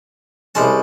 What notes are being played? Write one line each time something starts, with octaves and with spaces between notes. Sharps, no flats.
C2 G#3 C#4 A5